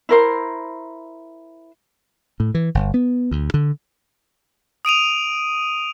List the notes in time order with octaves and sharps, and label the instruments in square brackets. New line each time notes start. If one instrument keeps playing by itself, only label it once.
[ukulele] E4 A#4 C5
[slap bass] A2
E3
G1
B3
D2
D3
[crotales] D#6 D7 D#7 F7